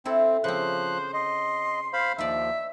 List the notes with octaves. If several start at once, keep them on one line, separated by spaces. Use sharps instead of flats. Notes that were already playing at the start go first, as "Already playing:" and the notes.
C4 E4 A4
C#3 F3 C4 C5 F#6
D#5 C6
C5 F5 B5
D#2 F3 D#4 C5 D5 E5